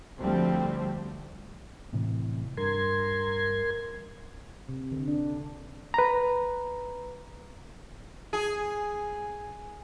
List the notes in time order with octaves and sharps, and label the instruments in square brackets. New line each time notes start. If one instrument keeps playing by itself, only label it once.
[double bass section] D2 D3 F3 G3 A3 C4
[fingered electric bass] A2 C3 E3
[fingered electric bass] G2 [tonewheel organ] A#4 C6 G#6
[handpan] C3
D3
D4
[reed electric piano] B4 A#5
[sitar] G#4